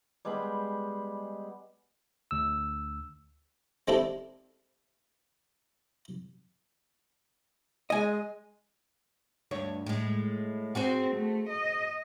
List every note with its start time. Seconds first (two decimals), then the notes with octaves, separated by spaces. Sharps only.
0.25 G3 G#3 B3 B5
2.31 D2 E6
3.88 G#3 C4 D4 E4 G4 A4
7.90 G#3 D#5 G#5
9.51 D2 G2 C#5
9.86 A2 G#3
10.75 C4 F#4 G#4 C5
11.15 A3
11.49 D#5